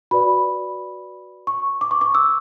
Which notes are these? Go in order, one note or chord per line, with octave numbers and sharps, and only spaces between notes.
F#4 B4 D5 B5
C#6
D6
C#6
D6
E6